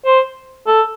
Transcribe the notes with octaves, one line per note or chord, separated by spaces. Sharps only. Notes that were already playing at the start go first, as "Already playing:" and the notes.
C5
A4